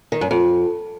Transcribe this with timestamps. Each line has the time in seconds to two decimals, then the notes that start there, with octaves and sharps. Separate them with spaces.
0.12 D#3
0.21 F#2
0.31 F2